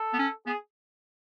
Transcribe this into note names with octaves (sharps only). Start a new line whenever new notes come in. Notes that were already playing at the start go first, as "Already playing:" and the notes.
Already playing: A4
B3
C#4
B3 G#4